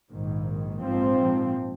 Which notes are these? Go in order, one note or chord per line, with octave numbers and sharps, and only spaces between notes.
A#1 G#2 D#3
A#1 G#2 F3 C4